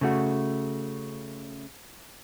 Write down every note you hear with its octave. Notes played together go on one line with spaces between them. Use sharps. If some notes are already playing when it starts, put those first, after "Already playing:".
C#3 A3 F#4